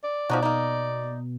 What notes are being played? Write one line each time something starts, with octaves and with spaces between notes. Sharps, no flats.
D5
B2 F3 D#4 F#4
A#3 D#4